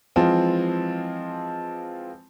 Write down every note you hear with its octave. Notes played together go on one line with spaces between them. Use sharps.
E3 F3 G#3 C4 F4